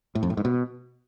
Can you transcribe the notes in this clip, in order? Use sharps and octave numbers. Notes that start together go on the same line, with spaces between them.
A2
F2
A2
G#2
B2